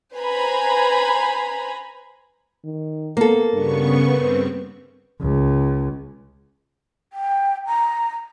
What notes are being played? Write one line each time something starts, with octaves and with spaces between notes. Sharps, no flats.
B4 C5 G#5 A#5 B5
D#3
A#3 B3 A4
G2 C#3 B3 C#6
G2 C4 B4
C#2
G5
A#5